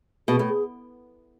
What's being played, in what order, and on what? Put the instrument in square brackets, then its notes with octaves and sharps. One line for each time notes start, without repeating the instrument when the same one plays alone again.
[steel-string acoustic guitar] B2 [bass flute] G#4
[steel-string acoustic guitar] A2
[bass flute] G#4